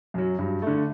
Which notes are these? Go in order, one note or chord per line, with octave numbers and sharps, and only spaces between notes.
F#2 F#3
G2
D3 A3